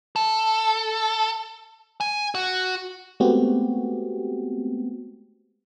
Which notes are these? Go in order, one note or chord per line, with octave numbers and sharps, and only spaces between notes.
A4
G#5
F#4
G#3 A3 B3 C4 F#4 G4